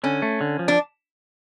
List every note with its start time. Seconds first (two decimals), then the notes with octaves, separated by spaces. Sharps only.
0.04 D3 C#4
0.22 A3
0.41 D3
0.59 F3
0.68 D4